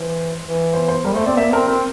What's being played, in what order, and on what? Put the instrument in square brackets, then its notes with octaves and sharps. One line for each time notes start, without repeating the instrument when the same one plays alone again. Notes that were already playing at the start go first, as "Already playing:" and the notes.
Already playing: [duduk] E3 [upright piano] C5
[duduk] E3
[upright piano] C5
C5
[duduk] G3 [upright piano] A#4
[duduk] A3 [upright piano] C5
[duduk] C4 [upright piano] D5
[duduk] A#3 [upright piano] E5
[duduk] C4 [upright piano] A#4
[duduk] C4 [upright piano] A#4